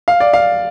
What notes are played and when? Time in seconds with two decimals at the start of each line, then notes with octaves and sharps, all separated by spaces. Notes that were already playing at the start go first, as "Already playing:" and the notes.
0.08 F5
0.20 D5
0.33 F5